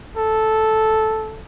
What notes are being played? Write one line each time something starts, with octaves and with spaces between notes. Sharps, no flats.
A4